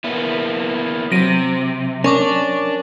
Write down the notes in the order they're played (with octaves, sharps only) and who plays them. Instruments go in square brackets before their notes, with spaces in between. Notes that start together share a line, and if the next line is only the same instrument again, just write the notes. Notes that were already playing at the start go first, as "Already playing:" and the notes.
[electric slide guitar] A#3 B3 E4
[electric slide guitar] C3 [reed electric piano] F#3 [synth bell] A#6 D7 D#7
[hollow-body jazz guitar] C#4 [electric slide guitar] D4 [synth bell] A#4 C#6 D6